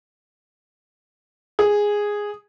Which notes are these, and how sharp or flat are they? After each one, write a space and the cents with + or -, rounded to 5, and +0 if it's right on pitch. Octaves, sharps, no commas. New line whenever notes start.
G#4 -5